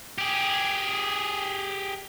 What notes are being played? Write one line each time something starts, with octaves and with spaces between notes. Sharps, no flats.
G4 G#4